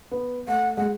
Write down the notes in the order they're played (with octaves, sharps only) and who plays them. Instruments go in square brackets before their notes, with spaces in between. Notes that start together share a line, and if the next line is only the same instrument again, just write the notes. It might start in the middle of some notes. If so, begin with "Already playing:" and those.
[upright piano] B3
[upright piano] A3 [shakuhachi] F#5
[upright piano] G#3 [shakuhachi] F#5